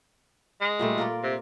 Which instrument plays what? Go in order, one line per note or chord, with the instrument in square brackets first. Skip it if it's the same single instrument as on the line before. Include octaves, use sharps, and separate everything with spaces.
[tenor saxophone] G#3
[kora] A#2 G3 A3
F4 A#4 D5
[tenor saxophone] C3